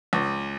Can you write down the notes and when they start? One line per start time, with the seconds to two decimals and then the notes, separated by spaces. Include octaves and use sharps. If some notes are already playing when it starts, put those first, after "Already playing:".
0.13 C#2